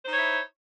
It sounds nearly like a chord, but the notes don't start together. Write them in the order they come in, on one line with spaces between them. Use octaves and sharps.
C5 D#4 C#5 E4